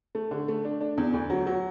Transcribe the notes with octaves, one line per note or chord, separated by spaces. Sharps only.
A3
D3
A3
D4
D4
E2
D2
F#3
F#3